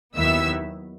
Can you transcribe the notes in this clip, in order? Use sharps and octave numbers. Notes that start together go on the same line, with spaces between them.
D#2 D#3 F#3 B3 E4 E5 E6